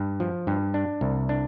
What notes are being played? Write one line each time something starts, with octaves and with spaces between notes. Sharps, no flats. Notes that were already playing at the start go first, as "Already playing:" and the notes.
Already playing: G2
F3
G2
D4
C2
D4